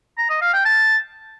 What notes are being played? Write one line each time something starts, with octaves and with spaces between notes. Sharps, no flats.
A#5
D#5
F5
G5
A5